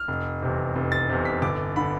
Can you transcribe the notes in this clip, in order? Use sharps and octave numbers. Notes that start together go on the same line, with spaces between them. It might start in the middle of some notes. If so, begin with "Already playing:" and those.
Already playing: F6
F1
E2 C3
F1
A6
E2 C3
B6
G1 D6
D3 B5